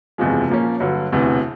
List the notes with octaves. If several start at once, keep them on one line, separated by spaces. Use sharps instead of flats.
F#1 E2 C3 F3 G#3
A#2 F3 A#3 C#4
G2 D3 F#3
E1 D2 C3 E3